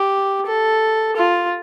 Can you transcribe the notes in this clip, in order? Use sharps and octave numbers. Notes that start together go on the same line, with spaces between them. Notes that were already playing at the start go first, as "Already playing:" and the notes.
Already playing: G4
A4
F4